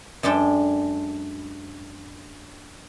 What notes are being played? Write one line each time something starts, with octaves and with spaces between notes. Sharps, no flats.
F#2 G#3 D4 A4 G5